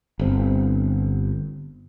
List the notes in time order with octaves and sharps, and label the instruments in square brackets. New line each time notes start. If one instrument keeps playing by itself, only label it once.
[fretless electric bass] G1 C4